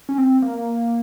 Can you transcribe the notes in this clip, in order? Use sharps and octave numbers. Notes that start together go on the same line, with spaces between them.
C#4
C4
A#3